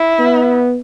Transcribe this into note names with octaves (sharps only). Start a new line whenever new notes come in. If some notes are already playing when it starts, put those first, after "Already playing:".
Already playing: E4
B3